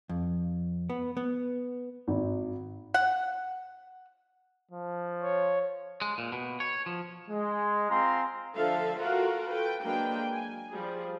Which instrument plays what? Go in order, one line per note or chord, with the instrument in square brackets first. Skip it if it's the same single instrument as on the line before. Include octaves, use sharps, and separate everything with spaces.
[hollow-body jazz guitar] F2
B3
B3
[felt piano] G#1
[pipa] F#5
[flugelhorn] F3
[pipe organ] C#5
[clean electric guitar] G#3
A#2
B2
C#5
F3
[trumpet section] G#3
C4 F4 F5 G#5 A#5 C6
[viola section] D3 F3 A4 E5 F5 A5
F4 F#4 A4 A#4 F5 F#5
A4 B4 G5
F#3 G#3 A#3 D4 B4 G5
G#5
F3 G3 G#4